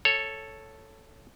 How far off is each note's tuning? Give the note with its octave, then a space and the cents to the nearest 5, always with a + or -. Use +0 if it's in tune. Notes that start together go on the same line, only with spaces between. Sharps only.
A4 +0 C#5 +0